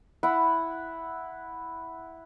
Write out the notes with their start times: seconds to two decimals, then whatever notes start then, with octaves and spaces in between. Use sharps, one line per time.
0.23 E4 F#5